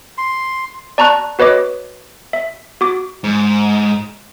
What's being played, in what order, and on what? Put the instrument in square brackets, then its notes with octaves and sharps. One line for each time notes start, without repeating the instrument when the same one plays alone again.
[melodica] C6
[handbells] D5 A5 A#5 C#6 F#6
F#4 B4 C#5 D#5 D6
E5
F#4 D6
[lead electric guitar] G#2